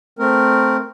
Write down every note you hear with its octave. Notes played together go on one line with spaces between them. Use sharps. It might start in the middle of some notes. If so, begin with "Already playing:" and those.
A3 C4 A#4